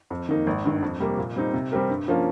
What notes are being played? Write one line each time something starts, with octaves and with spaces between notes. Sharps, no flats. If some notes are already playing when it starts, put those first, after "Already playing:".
F2
D#3 A#3 D#4
G#1
G2 D#3
F2
C3 G3 A#3
A#2
G3 C4 D#4
C3
G3 C4 G4 A#4
G2
F3 A#3 C#4 F4